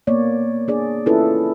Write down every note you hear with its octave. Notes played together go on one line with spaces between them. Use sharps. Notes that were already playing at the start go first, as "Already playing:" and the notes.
A#3 B3 C#5 D5
D4 G#4 D5
C#4 E4 F4 A4 B4